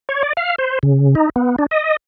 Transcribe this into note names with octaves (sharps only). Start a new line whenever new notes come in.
C#5
D5
F5
C5
C#3
D#4
B3
D4
D#5